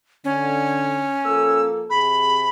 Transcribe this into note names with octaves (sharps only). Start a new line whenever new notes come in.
D3 C#4
F3 A#3 A4 E6
C3 G#4 B5